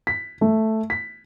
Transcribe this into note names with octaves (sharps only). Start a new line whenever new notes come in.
B6
A3
B6